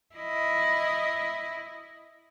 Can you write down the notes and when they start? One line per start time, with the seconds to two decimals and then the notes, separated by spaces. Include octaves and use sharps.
0.15 E4 D#5